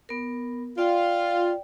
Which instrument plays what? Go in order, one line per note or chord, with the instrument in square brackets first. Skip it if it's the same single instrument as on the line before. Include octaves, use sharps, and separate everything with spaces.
[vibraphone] B3 A#4
[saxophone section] F4 [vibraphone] D5 G5